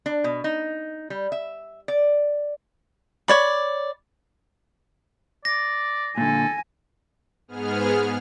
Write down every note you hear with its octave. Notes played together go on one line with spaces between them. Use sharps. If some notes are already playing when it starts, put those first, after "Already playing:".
D4
B2
D#4
G3
E5
D5
C#5 D5 B5
D5 A#6
A#2 D3 A4 G#5
G#2 B3 G#4 F6